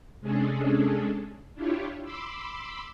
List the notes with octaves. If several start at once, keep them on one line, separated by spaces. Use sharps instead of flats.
C3 G#3 C#4 D4 G#4 A4
D4 E4 F4 G4 C#5
B5 C6 D6 E6